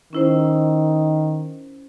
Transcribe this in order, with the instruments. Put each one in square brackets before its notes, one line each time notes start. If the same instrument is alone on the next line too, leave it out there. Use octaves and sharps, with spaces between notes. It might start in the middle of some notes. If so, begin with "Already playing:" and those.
[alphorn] D#3 [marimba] C#4 E4 C5